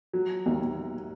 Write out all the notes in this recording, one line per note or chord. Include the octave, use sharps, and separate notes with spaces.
F#3
D#2